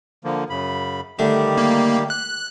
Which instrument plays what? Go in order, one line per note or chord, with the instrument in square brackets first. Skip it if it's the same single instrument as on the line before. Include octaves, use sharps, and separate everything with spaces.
[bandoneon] D3 F3 A#3
F#2 C#3 B5
[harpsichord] D3 A3 D4 [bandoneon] D#3 G3 G4
[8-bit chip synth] A#3
F#6